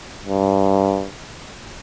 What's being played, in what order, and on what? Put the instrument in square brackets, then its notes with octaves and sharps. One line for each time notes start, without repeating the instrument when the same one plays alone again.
[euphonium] G2